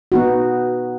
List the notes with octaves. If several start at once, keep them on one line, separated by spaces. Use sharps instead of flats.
B3 D#4 F#4